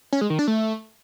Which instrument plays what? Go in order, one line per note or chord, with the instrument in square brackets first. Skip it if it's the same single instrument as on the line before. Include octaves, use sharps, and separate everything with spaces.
[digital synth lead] C#4
G#3
D#3
D4
A3